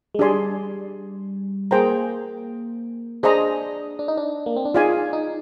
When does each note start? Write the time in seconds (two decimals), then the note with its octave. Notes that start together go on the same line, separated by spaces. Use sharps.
0.15 G#3
0.19 G3 D4 G#4 D5 G#5 C6
1.71 A#3 G#4 C5 G5 A#5
3.23 D4 G#4 C5 D#5 A#5
3.99 D4
4.08 D#4
4.17 D4
4.46 A#3
4.56 C4
4.65 D4
4.75 D#4 F4 G#4 D5 F5 G#5
5.13 D#4